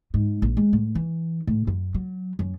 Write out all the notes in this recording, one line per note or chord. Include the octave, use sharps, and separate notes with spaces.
G#2
A#1
G#3
A2
E3
A2
F#2
F#3
F#2